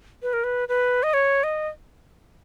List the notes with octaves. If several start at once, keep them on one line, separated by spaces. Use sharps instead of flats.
B4
A#4
B4
B4
D#5
C#5
D#5